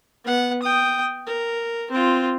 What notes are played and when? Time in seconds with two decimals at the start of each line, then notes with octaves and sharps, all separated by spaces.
0.24 B3 F#5
0.63 G5 D#6
1.27 A#4
1.91 C4 F4